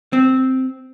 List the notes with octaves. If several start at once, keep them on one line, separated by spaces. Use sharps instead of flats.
C4